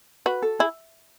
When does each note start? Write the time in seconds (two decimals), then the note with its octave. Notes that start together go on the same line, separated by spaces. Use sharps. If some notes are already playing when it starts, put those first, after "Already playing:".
0.26 F#4 B4
0.42 A4
0.59 E4 G#4